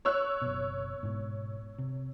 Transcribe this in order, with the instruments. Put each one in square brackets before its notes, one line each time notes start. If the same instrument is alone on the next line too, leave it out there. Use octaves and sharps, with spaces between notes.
[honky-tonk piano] C#5 E6 F#6
[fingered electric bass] F#1 B2
G#2 B2
C3